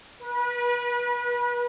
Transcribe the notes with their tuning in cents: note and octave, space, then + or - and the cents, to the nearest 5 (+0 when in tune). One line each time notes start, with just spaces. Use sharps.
B4 -30